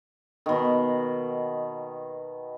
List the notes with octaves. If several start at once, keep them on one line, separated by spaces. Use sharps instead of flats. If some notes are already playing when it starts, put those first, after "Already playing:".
B2 D#3